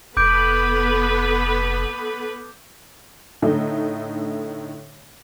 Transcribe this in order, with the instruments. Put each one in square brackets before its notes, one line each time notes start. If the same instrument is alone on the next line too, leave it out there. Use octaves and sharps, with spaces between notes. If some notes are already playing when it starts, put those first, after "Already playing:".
[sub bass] F1 [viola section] B3 A4 B4 [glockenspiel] D6 G6 D7
[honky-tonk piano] A2 D3 A3 D#4